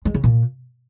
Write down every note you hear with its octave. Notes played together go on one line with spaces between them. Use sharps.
G#3
C#3
A#2